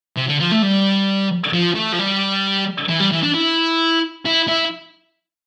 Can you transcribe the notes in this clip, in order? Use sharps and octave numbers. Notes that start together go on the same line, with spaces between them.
C3
D3
F3
A3
G3
F3
A3
F3
G3
E3
G3
E3
D4
E4
E4
E4